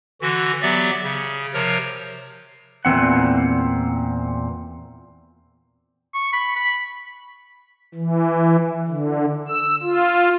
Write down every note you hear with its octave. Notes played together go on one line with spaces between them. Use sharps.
D3 E3 F#4
F#3 B3 G4 D5 E5
C#3
C3 F3 A#4 C#5
E2 A#2 E3 C4 F#5
C#6
B5
B5
E3
D3
E6
F4